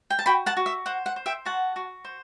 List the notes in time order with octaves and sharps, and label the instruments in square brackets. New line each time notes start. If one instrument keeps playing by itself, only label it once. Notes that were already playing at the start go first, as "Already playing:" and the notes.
[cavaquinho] G5
A5
F#4 G5 B5
F#5 A5
F#4
E5
C5 F#5
F#5
C5
E5 G5
F#4 F#5 A5
F#4
C5